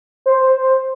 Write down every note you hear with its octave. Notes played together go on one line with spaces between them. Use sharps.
C5